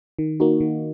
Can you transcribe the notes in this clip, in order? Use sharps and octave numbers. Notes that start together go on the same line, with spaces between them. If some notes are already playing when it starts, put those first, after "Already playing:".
D#3
A#3 D#4 F#4
D#3